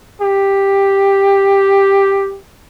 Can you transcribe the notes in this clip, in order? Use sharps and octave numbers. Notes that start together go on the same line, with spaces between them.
G4